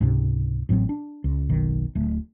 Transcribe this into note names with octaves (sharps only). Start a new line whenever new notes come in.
C#2 G#2 C3
A1 A2 F#3 C4
D4
C#2
F#1 B1 D#3
D1 A3